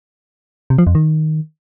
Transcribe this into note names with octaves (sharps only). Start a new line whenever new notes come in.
C3
F3
F2
D#3